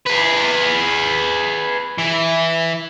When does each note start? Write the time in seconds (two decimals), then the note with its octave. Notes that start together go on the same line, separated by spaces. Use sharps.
0.06 G#4 B4
1.98 E3